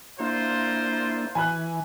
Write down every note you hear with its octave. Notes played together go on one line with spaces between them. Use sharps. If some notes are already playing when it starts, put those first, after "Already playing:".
A#3 D4 E4 F4 A#4 C5
E3 G#5 B5 F#6